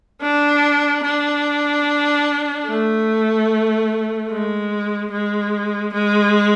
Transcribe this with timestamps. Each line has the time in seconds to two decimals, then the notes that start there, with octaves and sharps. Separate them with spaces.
0.22 D4
1.03 D4
2.67 A3
4.30 G#3
5.11 G#3
5.93 G#3